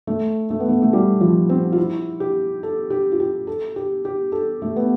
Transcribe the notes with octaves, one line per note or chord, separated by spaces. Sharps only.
A3
A3
B3
A3
A3
G3
F3
C4
F4
E4
G4
A4
G4
F4
G4
A4
G4
G4
A4
A3
B3